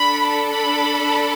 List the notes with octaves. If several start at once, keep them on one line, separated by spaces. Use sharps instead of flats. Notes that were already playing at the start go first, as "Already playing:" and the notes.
Already playing: D4 A4 B5
B5